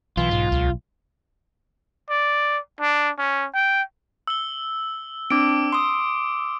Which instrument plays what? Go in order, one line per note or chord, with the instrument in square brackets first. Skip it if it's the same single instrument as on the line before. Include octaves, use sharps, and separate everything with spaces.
[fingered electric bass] B1 [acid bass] E3 [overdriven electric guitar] F4
[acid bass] G#2
C#2
[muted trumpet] D5
D4
C#4
G5
[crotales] E6 G7
[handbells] C4 D4 [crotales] D6 D7
[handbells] C6 D#6